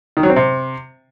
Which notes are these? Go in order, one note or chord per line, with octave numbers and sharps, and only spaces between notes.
D#3
F#3
C4
C3